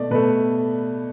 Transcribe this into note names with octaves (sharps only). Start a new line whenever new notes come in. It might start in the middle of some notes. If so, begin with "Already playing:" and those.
Already playing: B2 A3 D5
B2 A3 B4